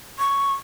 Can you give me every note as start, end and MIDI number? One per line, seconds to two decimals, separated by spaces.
0.19 0.53 85